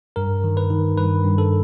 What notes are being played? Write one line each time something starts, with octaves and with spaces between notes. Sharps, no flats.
G2 A#4
D#3
B4
D#3
G2 B4
G2
A4